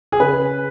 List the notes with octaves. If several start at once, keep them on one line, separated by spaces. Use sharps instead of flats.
G#4
C#3 B4